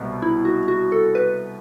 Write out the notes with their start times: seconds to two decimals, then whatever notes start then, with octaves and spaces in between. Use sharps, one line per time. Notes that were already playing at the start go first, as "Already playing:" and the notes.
Already playing: C2 B2
0.22 E4
0.45 F#4
0.68 F#4
0.92 A4
1.15 B4